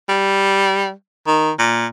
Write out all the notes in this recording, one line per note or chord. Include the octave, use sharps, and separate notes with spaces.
G3
D#3
A#2